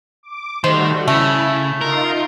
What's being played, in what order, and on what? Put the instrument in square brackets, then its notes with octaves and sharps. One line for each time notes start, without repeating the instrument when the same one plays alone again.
[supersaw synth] D6
[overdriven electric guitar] D#3 [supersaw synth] G3 A3 F#4 [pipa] C5
[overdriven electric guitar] C#3 [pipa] A3 [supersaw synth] E4
[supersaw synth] D#4 F4 C6 [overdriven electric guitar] A#4